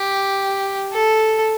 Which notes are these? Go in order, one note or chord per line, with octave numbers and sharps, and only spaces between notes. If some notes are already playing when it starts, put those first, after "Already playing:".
Already playing: G4
A4